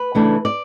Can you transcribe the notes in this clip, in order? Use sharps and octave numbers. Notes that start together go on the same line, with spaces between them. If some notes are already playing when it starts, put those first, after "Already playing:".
Already playing: B4
C#3 E3 A3 D4
D5